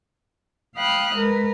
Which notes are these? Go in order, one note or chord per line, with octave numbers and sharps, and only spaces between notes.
F5 G5 B5 D#6 F6 F#6
G#3 A#4 B4